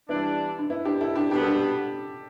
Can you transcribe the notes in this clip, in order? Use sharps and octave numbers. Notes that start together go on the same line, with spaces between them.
E3 G3 B3 D4 E4
D4
B3 E4
D4 G4
E4 A4
D4 G4
B2 G3 B3 D4 G4
A4
D4 G4